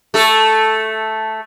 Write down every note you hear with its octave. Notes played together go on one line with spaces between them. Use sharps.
A3 A4